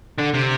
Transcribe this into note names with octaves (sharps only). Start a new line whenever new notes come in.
D3
C3